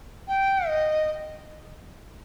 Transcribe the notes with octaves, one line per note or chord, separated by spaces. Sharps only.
G5
D#5